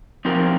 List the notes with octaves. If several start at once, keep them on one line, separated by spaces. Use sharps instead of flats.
F3 C4 D#4 G4 A#4